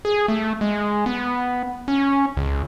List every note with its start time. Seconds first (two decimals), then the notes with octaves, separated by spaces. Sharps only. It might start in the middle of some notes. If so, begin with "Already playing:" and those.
0.05 G#4
0.28 A3
0.61 G#3
1.06 B3
1.88 C#4
2.37 C#2